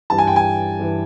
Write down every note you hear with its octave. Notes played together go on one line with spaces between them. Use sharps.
G2 E3 A5
G#5
G5
G#5
G2 E3